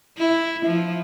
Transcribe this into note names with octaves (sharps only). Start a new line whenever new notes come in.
E4
F3